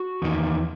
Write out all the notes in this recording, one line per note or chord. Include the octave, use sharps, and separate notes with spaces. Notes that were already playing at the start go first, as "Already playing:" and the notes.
Already playing: F#4
E2 D#3